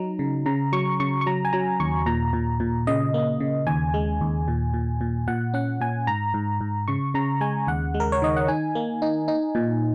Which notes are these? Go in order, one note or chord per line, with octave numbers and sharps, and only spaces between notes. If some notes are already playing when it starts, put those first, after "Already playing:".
Already playing: F#3 D#4 A#5
C#3
C#3 A#5
F#3 C#6
C#3 C#6
C#6
F#3 A#5
G#5
F#3 A#5
D#2 C#6
A#2 A#5
A#2
A#2
C#3 D#5
A#3
C#3
D#2 G#5
G#3
D#2
A#2
A#2
A#2
A#2 F#5
C#4 F#5
A#2 G#5
G#2 A#5
G#2
G#2
C#3 C#6
C#3 A#5
G#3 G#5
D#2 F#5
G#3
A#4
C#5
D#3 D#5
F#5
D#4 G#5
A#3
D#4
D#4
A#2